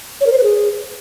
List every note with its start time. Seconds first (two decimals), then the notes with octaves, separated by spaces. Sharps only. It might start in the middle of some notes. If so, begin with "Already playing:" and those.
0.21 C#5
0.26 A#4
0.32 C5
0.38 B4
0.43 G#4